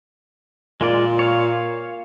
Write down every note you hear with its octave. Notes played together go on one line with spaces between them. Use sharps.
A#2 G#3 F4 D5
C#5 F5